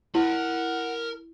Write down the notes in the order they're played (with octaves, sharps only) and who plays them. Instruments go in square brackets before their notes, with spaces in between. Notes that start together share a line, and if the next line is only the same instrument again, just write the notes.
[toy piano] E4 [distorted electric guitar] A#4 B5 [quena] F#5